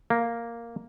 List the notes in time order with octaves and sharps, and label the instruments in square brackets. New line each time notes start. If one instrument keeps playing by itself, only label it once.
[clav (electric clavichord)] A#3